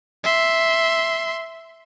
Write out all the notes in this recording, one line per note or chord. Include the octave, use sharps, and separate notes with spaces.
E5 C6